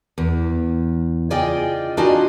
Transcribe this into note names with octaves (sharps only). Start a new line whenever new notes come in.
E2
C#3 F4 D5 D#5 G5 G#5
D4 D#4 F4 F#4 D#5 G#5